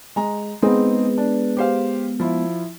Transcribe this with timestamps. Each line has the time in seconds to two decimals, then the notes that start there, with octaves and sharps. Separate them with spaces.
0.16 G#3 A#5
0.62 G#3 B3 C4 D#4 G#4
1.18 D4
1.57 G4 C5 F5
2.20 F3 E4